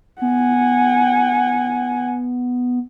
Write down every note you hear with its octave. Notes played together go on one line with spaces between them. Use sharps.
B3 F#5 G#5